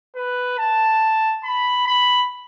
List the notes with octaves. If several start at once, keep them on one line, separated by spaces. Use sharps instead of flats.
B4
A5
B5
B5